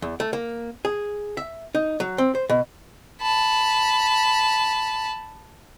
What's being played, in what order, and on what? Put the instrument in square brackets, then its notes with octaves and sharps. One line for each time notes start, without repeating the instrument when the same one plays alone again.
[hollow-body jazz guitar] E2
A3
A#3
G#4
E5
D#4
F#3
C4
C5
B2
[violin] A5 B5